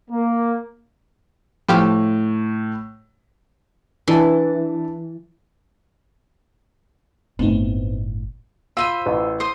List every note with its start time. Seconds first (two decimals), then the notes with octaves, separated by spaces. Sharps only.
0.11 A#3
1.68 A2 F3 G4 F5
4.08 E3 D4 E4 A5
7.39 G1 A2 B3 C4 D#4
8.77 F4 C5 B5 E6 D#7
9.06 A1
9.40 C5 C6 D#6